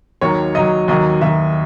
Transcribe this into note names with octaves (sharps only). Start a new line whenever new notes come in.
D#2 D#3 F#3 C#5
D#2 D#3 F#3 D#5
D#2 D#3 F#3 D#5
D#2 D#3 F#3 E5